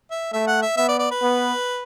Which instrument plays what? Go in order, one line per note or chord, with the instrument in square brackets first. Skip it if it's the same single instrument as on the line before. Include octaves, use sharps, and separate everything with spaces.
[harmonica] E5
[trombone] A3 [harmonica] E5
[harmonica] F#5
E5
[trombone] B3 [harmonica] E5
[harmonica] D5
D5
B4
[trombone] B3